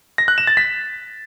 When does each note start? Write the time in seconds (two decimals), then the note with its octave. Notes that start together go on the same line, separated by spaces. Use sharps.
0.18 A#6
0.28 F#6
0.38 E7
0.47 A6
0.57 B6